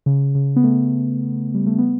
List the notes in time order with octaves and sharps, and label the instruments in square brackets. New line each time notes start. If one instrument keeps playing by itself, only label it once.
[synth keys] C#3
C#3
B3
A3
G3
A3
B3